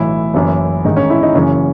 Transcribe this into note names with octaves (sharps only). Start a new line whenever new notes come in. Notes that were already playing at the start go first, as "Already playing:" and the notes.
Already playing: B1 A2 E3 E4
F#1 F#2 E3
A1 G#2 D#3 D#4
C#4
E4
D#4
F#1 F#2 C#3 E3 C#4